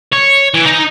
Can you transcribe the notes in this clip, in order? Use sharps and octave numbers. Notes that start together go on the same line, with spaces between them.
C#5
E3
D#4